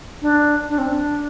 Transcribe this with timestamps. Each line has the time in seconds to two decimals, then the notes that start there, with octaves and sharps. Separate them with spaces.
0.22 D4
0.69 D4
0.78 C4
0.87 D4